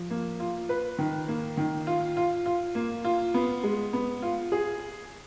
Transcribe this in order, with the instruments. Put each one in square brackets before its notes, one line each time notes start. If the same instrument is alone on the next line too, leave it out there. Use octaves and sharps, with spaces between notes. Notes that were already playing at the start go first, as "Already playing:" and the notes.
Already playing: [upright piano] F3
A#3
F4
B4
D#3
A#3
D#3
F4
F4
F4
A#3
F4
B3
G#3
B3
F4
G#4